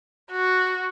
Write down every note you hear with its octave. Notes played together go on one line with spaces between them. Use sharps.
F#4